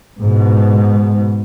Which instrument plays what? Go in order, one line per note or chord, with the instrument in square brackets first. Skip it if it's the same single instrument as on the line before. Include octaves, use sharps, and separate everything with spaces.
[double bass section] G#2 B2